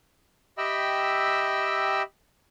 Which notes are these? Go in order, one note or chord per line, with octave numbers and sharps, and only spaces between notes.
G4 D#5 E5 G5 B5 E6